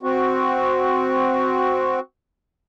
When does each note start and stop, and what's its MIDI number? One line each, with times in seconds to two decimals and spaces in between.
0.03 2.00 60
0.03 2.00 66